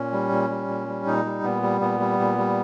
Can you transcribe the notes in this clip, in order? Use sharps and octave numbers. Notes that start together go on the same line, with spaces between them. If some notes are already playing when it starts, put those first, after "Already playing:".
Already playing: A#2 C#4
G3
A#2
G3
A#2
G3
A#2 D#4
G3
A#2 B3
G3
A#2 B3
G3
A#2
G3